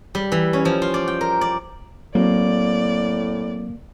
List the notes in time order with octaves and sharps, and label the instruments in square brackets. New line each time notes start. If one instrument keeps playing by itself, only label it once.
[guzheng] G3
E3
C#4
F3
F4
D5
G5
A#4
D5
[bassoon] A2 [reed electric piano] F#3 C4 [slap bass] A#3 [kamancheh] D5